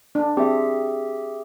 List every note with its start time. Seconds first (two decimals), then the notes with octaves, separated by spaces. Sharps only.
0.15 D4
0.37 C4 G4 G#4 E5